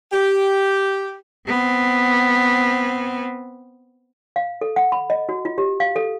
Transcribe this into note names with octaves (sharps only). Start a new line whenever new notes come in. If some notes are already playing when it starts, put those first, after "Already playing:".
G4
B3 C4
F5
A4
F#5
B5
D#5
F#4
F4
G4
F5
A4